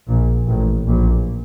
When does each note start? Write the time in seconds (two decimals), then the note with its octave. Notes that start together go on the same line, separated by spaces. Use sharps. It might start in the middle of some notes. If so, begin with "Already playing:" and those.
0.08 A#1 A#2
0.47 A1 A2
0.88 A#1 A#2